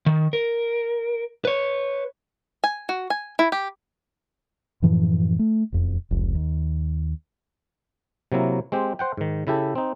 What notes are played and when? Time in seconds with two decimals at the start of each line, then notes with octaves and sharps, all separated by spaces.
0.06 D#3
0.33 A#4
1.45 B4 C#5
2.64 G#5
2.89 F#4
3.10 G#5
3.39 E4
3.52 G4
4.82 F#2 A2 E3 F3
5.39 A3
5.72 E1 F2
6.11 F1 C#2
6.35 D#2
8.32 C3 F#3 A#3 E4
8.72 G#3 C4 G4
8.99 C5 F#5 G5
9.17 G#2 D#3
9.47 C#3 E4 G4 A4
9.75 C4 D#4